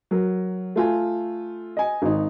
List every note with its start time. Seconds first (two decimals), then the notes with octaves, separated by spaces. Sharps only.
0.11 F#3 A#4
0.76 A3 F4 G#5
1.77 D#5 G#5
2.02 G#1 D#4